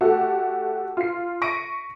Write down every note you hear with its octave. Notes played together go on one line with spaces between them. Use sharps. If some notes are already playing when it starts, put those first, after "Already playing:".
A3 F#4 G4 A4
F4 C7
C#6 A#6 B6 D7 D#7